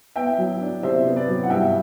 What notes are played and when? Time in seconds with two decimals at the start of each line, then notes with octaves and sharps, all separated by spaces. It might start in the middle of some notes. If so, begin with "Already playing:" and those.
0.16 B3 E5 G5
0.38 F#3
0.61 D4
0.83 C3 C5 E5
1.05 B3
1.16 B4 D5
1.28 F#3
1.43 F#5
1.50 G2 E5 G5